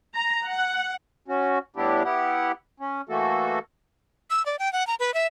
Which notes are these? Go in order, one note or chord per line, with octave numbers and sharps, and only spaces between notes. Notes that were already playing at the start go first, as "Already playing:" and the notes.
A#5
F#5
C#4 F#4
A2 G3 B3 D4 E4 G4
B3 E4 G4 F#5
C#4
E3 A3 A#3 F#4 A4
E6
D5
G5
F#5
A#5
B4
E5